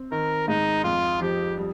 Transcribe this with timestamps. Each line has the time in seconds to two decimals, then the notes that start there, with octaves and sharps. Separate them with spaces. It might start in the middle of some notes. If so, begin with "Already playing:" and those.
Already playing: C4
0.12 D#3 A#4
0.48 G#2 D#4
0.84 F2 F4
1.21 F3 G4
1.57 G3